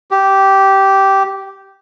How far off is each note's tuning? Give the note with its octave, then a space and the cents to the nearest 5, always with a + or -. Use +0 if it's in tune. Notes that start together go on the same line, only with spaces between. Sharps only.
G4 -10